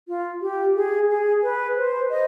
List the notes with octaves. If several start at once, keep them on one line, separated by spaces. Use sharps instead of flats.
F4
G4
G#4
G#4
B4
C5
D#5